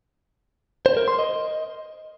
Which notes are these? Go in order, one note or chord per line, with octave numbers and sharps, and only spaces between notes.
C5
A#4
C6
D#5